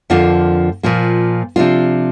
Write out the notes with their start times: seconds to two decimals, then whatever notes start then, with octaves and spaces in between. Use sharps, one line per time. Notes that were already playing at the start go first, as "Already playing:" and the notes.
0.10 F2 D3 F3 A#3 F4
0.83 A#2 F3 A#3
1.56 C3 F3 D4 F4